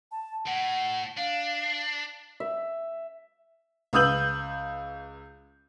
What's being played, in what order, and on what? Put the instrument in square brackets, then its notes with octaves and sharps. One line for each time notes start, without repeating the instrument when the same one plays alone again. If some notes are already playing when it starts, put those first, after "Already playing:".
[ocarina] A5
[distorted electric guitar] A2 [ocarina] F#5
[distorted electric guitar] D4 [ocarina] F5
[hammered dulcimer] E5
[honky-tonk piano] C#2 B4 D#6 E6 G6 F#7